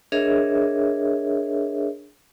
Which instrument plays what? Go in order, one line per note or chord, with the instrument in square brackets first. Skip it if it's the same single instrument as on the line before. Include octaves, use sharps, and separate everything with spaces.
[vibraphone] D4 G#4 A#4 C#5 D#5 E5